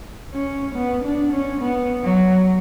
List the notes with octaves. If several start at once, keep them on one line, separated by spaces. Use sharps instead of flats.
C#4
B3
D4
C#4
B3
F#3